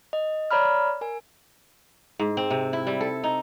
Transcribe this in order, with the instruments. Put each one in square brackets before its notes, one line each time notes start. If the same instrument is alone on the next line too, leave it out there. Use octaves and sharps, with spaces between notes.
[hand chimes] D#5
C#5 D5 A#5 B5 F6
A#4 G#5
[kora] G#2
C4
C3
E4
G3
A4
D#4